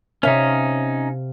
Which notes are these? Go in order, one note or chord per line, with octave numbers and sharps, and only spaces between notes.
C3 C#4 D#4 C#5 E5 F5